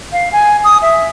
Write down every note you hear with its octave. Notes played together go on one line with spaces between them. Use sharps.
F5
G#5
D#6
E5